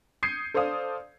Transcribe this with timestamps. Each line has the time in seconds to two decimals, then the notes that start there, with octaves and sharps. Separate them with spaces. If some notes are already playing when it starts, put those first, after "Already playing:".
0.23 D#6 G6 G#6 C7 C#7 D#7
0.54 A4 C5 D5 F5 D#6